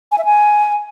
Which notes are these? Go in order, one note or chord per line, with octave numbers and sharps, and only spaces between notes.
G#5
E5
G#5